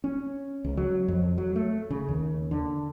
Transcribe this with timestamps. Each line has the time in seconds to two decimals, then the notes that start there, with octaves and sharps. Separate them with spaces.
0.04 C#4
0.65 C#2
0.77 F#3
1.08 F2
1.38 F#3
1.56 A3
1.90 C#3
2.08 D#2
2.51 D3